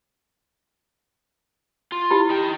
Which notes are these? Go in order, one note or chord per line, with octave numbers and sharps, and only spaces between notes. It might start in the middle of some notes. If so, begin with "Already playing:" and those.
F4
E4 G4 B5
D#4 G5